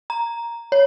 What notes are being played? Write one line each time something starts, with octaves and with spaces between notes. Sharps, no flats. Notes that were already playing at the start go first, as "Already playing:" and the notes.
A#5
C#5